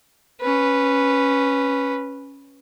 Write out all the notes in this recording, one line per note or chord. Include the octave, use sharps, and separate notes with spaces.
C#4 B4